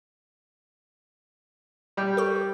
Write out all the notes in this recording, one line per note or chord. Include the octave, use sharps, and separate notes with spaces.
G3 D5 G5
A4 C#6